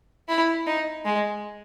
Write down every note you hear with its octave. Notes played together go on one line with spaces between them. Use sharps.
E4
D#4
G#3